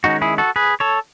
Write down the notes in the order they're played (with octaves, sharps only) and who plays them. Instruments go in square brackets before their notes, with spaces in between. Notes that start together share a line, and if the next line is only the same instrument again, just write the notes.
[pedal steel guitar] D#3 G#3 C#4 D#4 F#4
E4 G#4
F#4 A4
G#4 B4
A4 C#5